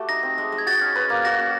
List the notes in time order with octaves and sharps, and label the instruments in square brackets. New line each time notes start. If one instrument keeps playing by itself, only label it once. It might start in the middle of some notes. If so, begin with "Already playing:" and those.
Already playing: [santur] A3 F#4 G4 A4
[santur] D#4 [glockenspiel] A#6
[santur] C4
G#3
G#3
[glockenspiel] G#6
[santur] F#4 [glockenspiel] A6
[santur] C#4
B4
A#3
[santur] F#4 [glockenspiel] A#6
[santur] C#4